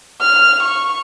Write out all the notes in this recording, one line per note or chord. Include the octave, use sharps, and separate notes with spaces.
F6
C#6